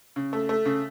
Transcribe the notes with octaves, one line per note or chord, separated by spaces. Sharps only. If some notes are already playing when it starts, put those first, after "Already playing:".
C#3
A3
A3
C#3